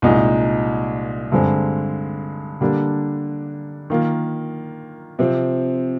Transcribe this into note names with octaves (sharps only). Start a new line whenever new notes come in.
C2 A#2 G#3 D#4
G2 D3 G#3 C4
D3 G3 A#3 D4
D#3 A#3 F4
C3 F3 C4